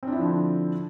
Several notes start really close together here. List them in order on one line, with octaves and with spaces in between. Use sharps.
C4 D4 E4 F3 D3